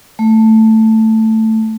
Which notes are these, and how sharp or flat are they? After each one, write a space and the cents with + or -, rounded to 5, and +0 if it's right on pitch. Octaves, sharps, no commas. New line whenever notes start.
A3 +10